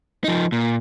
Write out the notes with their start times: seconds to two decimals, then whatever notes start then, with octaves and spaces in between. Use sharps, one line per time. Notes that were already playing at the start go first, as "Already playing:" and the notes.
0.24 F3 D#4
0.52 A#2